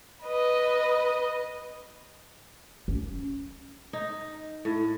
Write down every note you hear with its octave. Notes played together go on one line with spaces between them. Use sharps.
B4 D#5
C#4
D#4
A2